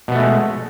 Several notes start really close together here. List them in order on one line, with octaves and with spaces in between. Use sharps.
B2 B3 A3 G#3